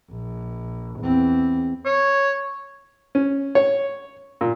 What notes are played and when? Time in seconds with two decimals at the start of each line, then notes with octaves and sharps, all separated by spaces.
0.11 A#1
1.00 E2 C4
1.86 C#5
3.15 C#4
3.55 C#5
4.41 A#2